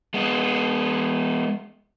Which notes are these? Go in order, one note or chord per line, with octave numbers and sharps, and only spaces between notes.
G#3 B3